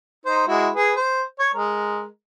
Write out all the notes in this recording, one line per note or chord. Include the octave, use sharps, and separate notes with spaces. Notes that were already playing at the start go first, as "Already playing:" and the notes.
D#4 C5
G#3 E4 F#4
G#4 B4
C5
C#5
G#3 A#4